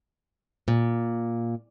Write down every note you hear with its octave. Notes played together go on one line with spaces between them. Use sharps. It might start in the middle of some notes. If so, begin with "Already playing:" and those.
A#2